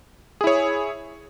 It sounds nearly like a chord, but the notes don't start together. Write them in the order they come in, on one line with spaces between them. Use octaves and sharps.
G#4 E4 C#5